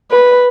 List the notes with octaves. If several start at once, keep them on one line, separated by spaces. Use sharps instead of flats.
B4